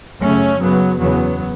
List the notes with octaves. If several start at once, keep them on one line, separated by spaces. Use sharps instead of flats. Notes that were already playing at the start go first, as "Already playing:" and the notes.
F#2 C#3 A3 C#4
F#2 C#3 F#3 B3
E2 C#3 F#3 B3